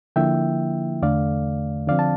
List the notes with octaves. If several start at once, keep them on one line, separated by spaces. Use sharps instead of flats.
D3 F3 A#3 E4 E5 G5
E2 D3 A3 D5 F5
D3 F3 C4 D5 F5
A5